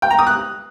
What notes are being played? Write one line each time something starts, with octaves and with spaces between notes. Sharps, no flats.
G5
A#5
D#6
F#6